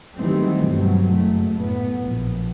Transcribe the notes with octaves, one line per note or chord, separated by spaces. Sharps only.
D#3 E3 F#3 G3 A3 C4
G1 B2 F#3 G3
F#1 F#2 A3
A2 B3
A#1